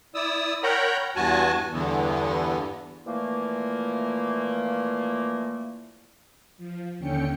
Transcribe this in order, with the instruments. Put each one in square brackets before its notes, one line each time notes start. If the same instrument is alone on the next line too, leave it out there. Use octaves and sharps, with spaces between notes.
[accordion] E4 D5 D#6 E6
A#4 C#5 F#5 G5 A#5 B5
E2 G2 F#4 G#5 A5
E2 G2 D3 E3 B3
[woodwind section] A#2 E3 F3 A3 A#3
[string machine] F3
D#2 D3 C#4 G5 C#7